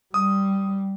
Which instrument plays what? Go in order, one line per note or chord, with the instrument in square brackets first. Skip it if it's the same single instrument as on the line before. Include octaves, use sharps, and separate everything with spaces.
[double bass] G3 [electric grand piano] D#6